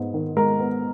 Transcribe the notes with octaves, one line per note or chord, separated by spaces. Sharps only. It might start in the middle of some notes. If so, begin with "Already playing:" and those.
Already playing: G#2 G#3 B3
D#3
G#3 A#4
B3